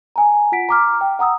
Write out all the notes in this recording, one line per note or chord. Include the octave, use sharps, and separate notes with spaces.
G#5 A#5
F4 F#5 B6 D7
A#5 D6 F6
G5
F#5 A#5 D#6 E6